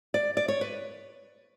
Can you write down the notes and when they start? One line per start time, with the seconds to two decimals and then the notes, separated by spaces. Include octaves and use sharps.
0.14 D5
0.37 D5
0.48 C#5
0.61 B4